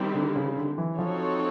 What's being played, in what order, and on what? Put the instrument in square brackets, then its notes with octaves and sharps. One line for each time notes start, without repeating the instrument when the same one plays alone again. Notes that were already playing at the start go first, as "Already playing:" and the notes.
Already playing: [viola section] D#3 G3 C4 E4 G4
[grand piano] D3
C#3
D3
E3
[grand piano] F3 [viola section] C4 D#4 F#4 A4 C#5